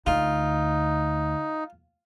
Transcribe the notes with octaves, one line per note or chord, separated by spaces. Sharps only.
D2 D#4 F4